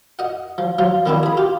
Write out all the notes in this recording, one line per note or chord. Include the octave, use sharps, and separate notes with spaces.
D#5 F#5
F3
F3 F#3 F4
D#3 F3 B3 C4 D4 E4
G#4 B5
F4 G4